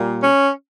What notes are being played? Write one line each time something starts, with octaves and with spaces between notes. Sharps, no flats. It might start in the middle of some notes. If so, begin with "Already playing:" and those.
Already playing: A#2 G3 A#3
C#4